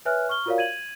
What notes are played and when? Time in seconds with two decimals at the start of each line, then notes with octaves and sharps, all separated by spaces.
0.05 B4 C#5 E5 G#5 F6 F#6
0.29 C#6 F6 G7
0.46 F4 F#4 A#4 C#5 D5 F5
0.58 G#6 D#7 F#7